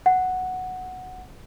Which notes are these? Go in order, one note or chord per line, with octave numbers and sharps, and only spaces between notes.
F#5